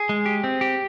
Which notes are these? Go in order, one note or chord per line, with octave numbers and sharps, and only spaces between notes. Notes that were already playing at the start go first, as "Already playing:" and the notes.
Already playing: G#4
G#3
G4
C4
G4